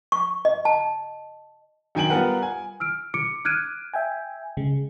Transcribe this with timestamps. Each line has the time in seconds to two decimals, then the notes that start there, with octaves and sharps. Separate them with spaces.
0.12 C#6
0.45 D#5
0.65 A5
1.95 F#2 D#3 G5 G#5 D7 F#7
2.10 G3 B3 F4 A#4 B4 F#5
2.42 G#5
2.80 E6 F6 D7
3.14 D6 C#7 D7
3.45 D6 F6 F#6 G#6 D7 D#7
3.94 E5 G5 G#5
4.57 C#3 G#3